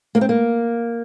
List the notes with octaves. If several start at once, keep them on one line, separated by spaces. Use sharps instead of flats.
A#3
C4
A#3